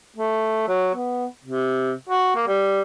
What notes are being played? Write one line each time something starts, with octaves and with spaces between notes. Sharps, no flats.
A3
F#3
B3
C3
F#4
A#3
G3